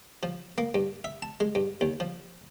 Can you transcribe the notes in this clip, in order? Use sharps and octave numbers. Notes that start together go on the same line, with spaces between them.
F3
A#3
G2
E5
A5
G#3
G2
D#2
F3